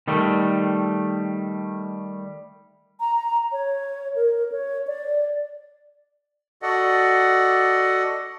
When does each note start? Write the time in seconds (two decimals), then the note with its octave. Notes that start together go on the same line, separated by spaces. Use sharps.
0.08 D#3 G3 A3
3.00 A#5
3.52 C#5
4.16 A#4
4.52 C#5
4.87 D5
6.62 F#4 A4 D5 D#5 F#5